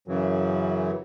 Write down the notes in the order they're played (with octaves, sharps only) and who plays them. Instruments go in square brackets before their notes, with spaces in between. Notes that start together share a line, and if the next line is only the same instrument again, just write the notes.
[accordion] F#2 C#3 E3 F#3